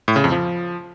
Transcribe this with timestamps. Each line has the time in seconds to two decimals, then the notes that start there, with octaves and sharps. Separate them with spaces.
0.08 A2
0.16 C#3
0.24 F2
0.32 F3